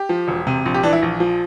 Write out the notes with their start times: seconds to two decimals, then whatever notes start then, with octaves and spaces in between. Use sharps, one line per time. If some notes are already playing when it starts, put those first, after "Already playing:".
Already playing: G4
0.09 F3
0.28 E1
0.47 C3
0.66 A#1
0.74 G4
0.83 E3 D4
0.93 E4
1.02 A#1
1.20 F3